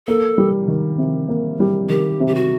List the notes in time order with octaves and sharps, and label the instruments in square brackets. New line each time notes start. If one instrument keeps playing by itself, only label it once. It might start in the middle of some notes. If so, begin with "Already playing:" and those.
[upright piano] A#3 [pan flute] A4
[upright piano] G3
D#3
C3
A#3
G3
[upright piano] D#3 [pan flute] G4
[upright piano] C3
[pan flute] G4
F#4